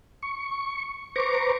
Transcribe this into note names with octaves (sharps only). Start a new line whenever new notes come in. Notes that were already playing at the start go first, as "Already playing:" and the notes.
C#6
B4 C5 A#5 C#6 D6